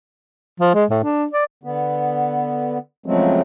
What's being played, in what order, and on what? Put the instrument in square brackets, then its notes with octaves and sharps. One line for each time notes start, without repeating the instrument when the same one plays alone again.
[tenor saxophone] F3
G#3
A2
D4
D5
[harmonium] D3 B3
C#3 F3 F#3 G#3 A3 C4